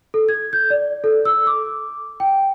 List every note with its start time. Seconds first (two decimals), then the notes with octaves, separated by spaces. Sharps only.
0.14 A4
0.29 G#6
0.53 G6
0.70 D5
1.04 A4
1.25 E6
1.47 D6
2.20 G5